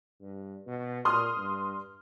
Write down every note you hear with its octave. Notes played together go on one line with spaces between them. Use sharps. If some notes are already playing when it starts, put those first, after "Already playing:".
G2
B2
A#2 C6 D#6 F6
G2